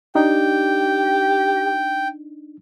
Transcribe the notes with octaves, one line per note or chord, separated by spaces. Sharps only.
D4 D#4 G4 G5